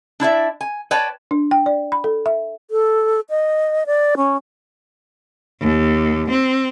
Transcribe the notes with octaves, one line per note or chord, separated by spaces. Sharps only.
D4 E4 D5 E5
G#5
B4 C#5 D5 G5 A5
D4
G5
D5
B5
A4
E5
A4
D#5
D5
C#4
D#2
C4